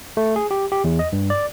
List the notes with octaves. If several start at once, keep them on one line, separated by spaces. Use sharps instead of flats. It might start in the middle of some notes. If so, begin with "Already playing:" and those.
A3
G#4
G4
G4
E2
D#5
G2
D5